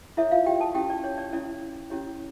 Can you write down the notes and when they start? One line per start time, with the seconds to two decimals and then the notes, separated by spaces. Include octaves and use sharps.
0.17 E4 A4 C#5 E5
0.31 F4 F5
0.46 G4 G5
0.60 A4 A5
0.74 C#4 E4 G4 A4 G5
0.90 D5
1.04 C#5
1.18 D5
1.33 C#4 E4 A4 D5
1.90 C#4 E4 G4 C#5